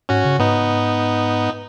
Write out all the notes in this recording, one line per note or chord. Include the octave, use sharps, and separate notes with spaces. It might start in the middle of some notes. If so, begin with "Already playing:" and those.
G#2 C#4 F#4
C#3
G#2 B3 D#4